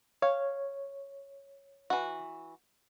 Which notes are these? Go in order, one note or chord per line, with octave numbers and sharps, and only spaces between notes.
C#5 F5
E3 F#4